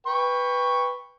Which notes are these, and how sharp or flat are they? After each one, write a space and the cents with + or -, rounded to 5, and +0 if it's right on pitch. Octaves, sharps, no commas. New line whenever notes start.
B4 +0 G5 +25 C#6 +0